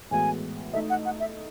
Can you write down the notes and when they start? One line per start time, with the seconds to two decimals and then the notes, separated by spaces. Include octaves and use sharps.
0.11 A2 E3 G#3 B3 F#4 G#5
0.73 A3 D#4 A4 D#5 E5
0.90 F#5
1.05 F#5
1.20 E5